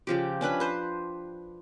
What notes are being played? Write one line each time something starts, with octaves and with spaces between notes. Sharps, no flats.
C#3 F3 G4
C#4 D4 B4 B5
B4 C5